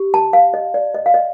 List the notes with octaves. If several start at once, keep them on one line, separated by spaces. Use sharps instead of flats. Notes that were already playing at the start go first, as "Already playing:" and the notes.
Already playing: G4
A5
F5
D#5
D5
D#5
F5
D#5